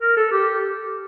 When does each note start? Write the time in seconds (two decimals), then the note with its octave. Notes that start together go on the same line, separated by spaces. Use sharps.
0.01 A#4
0.16 A4
0.32 G4